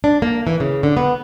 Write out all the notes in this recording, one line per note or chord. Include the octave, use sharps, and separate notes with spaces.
D4
A#3
E3
C#3
D3
B3